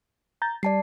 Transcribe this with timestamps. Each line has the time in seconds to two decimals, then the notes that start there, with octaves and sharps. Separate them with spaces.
0.42 A#5 G6 A6
0.63 G3 D5 A5 C7